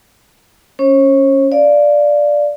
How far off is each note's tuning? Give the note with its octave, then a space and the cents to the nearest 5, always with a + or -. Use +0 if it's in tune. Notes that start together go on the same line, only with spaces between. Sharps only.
C#4 +0 C#5 -45
D5 +0 F5 +0